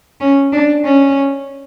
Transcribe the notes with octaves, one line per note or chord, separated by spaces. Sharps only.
C#4
D4
C#4